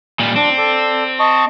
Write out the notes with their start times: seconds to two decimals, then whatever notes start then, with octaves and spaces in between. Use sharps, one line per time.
0.19 A#2 G3
0.36 C4 D4
0.58 A4 D5
1.19 D#5 A5 C#6